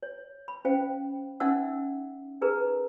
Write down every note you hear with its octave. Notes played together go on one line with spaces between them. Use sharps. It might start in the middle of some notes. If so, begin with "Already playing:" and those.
C#5
B5
C#4 C5 F5 G5
C#4 D#4 E5 F#5 E6
D#4 G#4 A#4 B4 A#5